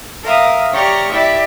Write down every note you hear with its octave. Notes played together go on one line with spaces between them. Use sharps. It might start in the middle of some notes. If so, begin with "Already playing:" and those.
A#4 E5 F5 D#6
G4 C#5 D5 A#5 C#6 F6
E4 G4 D5 E5